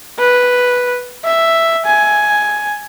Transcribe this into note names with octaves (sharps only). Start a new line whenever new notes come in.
B4
E5
G#5